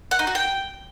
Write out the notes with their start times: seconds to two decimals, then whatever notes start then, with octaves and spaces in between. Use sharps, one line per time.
0.11 F#5
0.19 D#4
0.27 F#4
0.35 G5